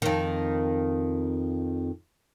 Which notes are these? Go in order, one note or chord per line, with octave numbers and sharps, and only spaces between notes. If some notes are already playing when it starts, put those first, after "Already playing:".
F2 D#3